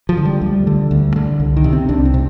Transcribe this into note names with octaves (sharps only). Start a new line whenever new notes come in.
F3
D3
G3
D2 G3
D3
D2
D3
C2
D#3
C3
C4
C2 D4
C4
C3